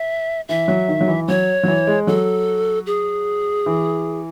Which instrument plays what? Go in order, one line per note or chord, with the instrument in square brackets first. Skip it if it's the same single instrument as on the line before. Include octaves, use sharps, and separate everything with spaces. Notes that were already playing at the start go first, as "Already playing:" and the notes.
Already playing: [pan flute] E5
[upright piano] E3 [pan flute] E5
[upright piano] F#3
D#3
F#3
E3
[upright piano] F#3 [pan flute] C#5
[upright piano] F#3
E3
G#3
[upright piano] F#3 [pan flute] A4
[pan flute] G#4
[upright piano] E3